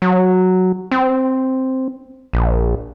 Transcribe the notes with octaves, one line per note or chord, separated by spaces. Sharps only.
F#3
C4
A#1